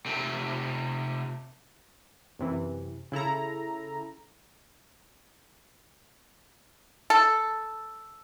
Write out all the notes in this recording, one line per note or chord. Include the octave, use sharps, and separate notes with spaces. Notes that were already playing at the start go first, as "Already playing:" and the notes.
C3 A3
F#2 C3 E3
C#3 E4 A4 A#5
A4